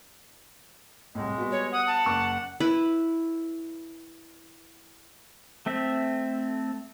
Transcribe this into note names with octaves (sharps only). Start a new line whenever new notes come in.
C2 A2 G#3
G3 B3 F#4
C#5
F#5 D#6
A5
F#1 C#6 D6
E4 B4
A3 C4 E5